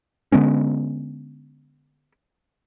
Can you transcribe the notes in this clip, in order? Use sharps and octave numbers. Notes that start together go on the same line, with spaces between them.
D3 G#3 B3 C#4